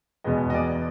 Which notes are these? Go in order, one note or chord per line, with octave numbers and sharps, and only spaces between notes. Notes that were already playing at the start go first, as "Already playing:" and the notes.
E2 B2 G#3 B3 D#5
D#5
D5